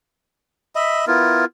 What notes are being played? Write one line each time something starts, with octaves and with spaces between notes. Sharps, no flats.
D#5 E5 B5
B3 E4 F4 A#4